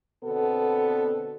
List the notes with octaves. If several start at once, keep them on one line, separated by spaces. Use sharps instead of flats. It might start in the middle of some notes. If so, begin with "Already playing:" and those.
B2 D3 B3 C4 A4